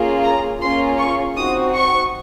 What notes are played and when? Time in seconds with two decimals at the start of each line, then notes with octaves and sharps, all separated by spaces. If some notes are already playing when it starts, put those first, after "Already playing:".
Already playing: A#3 C#4 F4 G#4
0.23 A#5
0.61 A#3 C#4 F4 G#4 C6
0.98 C#6
1.36 C4 D#4 F#4 D#6
1.75 C#6